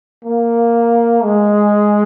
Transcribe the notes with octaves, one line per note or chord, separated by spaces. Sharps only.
A#3
G#3